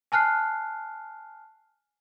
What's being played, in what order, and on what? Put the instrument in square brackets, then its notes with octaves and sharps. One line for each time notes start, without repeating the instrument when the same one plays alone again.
[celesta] G#5 A5 F6 F#6 C7